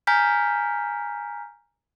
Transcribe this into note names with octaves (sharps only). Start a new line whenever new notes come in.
G#5 A#5 F6 G6 B6